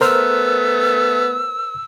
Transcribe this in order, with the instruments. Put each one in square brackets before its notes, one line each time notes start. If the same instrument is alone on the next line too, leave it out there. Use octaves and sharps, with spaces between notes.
[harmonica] A3 B3 [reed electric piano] A#4 C5 F6 [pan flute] E6